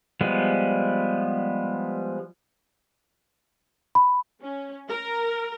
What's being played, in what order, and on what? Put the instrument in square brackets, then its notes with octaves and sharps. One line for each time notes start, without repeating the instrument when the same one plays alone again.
[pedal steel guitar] F3 G3 G#3 B3
[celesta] B5
[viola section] C#4
A#4